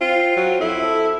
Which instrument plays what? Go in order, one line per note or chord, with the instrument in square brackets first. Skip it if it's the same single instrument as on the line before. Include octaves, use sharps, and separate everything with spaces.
[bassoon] C4 [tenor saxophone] F4
[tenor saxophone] F#3
[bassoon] F2 [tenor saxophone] E4
[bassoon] A4